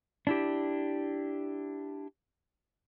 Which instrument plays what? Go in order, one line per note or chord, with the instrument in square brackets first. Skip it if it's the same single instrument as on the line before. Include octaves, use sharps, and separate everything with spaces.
[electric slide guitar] D4 E4 G4